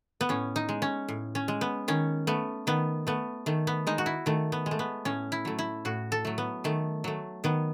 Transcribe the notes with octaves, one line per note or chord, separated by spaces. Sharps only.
B3
A2 C#4
D#4
G#3
C#4
A2
C#4
G#3
B3
D#3 C#4
A3 B3
D#3 B3
A3 B3
D#3 A3
B3
G#3 D#4
F#4
E4
D#3 A3
B3
G#3
A3
B3
A2 C#4
E4
F#3 A3
E4
A2 F#4
A4
F#3 A3
B3
D#3 A3
F#3 A3
D#3 B3